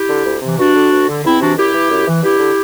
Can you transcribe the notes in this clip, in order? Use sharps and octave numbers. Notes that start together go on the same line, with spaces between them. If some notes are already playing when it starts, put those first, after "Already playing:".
Already playing: E4 G4
D3
D2
C3 E3
G2 D4 F#4
D3
D2
D3
E2 C4 E4
C3 E3 D4 F#4
F#2 E4 G4
E3
F#2
E3
G2 E4 G4
D3